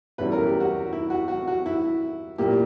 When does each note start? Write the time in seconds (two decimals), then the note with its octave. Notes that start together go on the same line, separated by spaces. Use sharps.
0.18 E2 B2 G3 C#4 E4 B4
0.32 A#4
0.46 G4
0.60 F#4
0.93 E4
1.10 F#4
1.28 F#4
1.48 F#4
1.66 E4
2.38 A#2 A#3 E4 G4